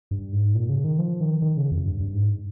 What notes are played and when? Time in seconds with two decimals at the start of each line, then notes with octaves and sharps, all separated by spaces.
0.11 G2
0.33 G#2
0.55 A#2
0.69 C#3
0.84 D#3
0.99 F3
1.21 D#3
1.42 D#3
1.57 C#3
1.71 F2
1.86 G2
2.00 G2
2.15 G#2